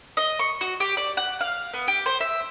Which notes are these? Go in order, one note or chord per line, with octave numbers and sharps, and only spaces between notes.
D#5
C#6
F#4
G4
D5
F#5
F5
B3
G4
C5
E5